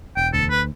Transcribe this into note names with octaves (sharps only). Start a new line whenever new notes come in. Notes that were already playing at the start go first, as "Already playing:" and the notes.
E1 G5
D2 A4
B4